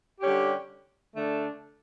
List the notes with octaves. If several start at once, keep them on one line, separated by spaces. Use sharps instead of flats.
D3 G3 C#4 G4
D3 A3 D4